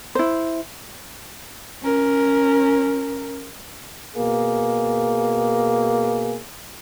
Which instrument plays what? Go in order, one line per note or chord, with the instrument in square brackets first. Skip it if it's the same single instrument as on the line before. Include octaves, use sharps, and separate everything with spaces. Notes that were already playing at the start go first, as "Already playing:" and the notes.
[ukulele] E4 C5
[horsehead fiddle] C#4 A#4
[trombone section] B2 A#3 G#4